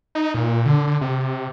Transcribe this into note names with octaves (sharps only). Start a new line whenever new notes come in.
D#4
A#2
D3
D3
C3